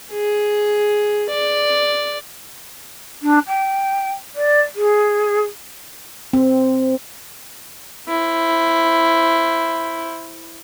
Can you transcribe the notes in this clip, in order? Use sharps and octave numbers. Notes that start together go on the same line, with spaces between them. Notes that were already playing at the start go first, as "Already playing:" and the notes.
G#4
D5
D4
G5
D5
G#4
C4
E4 C5